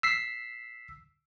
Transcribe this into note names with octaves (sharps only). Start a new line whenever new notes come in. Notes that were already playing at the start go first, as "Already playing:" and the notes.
E6 B6 C7